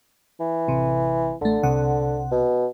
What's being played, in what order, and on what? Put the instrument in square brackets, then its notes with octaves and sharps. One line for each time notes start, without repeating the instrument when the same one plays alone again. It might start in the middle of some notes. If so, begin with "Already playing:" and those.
[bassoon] E3
[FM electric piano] A1 C3
[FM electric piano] A1 A3 [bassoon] D3
[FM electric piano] C2 C3 F#5
[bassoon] B2